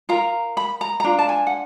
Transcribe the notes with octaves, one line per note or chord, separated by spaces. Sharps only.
F4 A#4 A#5
B5
A#5
A#5
D4 F4
A5
G#5
F#5